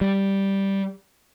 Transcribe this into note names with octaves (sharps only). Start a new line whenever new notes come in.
G3